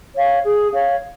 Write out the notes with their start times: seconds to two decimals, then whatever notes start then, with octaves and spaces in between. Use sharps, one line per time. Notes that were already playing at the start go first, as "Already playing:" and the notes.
0.16 C#5 F5
0.44 G#4
0.73 C#5 F5